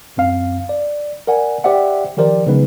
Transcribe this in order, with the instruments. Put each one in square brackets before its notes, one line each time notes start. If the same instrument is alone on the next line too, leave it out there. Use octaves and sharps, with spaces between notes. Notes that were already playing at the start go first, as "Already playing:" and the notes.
[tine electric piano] C#2 F#2 C4 F5
D5
A#4 D5 F#5 G#5
G4 C5 D5 E5 F#5
D#3 F3 G4 A#4 C5 D5
C#3 F#3 G#3 B3 D#4 B4